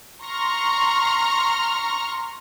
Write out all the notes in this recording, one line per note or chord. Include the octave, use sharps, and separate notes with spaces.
A#5 C6 C#6 F6